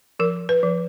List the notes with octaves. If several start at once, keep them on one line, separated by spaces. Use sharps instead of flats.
F3 A#4
B4
F3